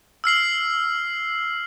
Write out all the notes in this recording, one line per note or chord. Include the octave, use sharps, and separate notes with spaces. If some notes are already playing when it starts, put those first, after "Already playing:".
E6 F6 C7 F#7